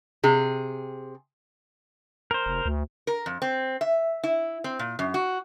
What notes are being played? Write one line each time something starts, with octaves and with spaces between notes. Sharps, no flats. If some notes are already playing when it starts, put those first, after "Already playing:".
C3 G#4
A#4 C5
F1
D2
A#4
F2
C4
E5
E4
C4
A#2
F#2
F#4